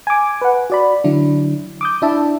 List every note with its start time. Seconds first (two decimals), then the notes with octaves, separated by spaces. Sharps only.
0.07 G#5 D6
0.41 B4 F#5
0.70 F#4 D5 B5
1.04 D3 F#3 D4 E4
1.81 D6 D#6 G6
2.02 D4 E4 E5 A5